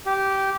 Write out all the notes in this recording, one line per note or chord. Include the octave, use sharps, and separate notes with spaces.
G4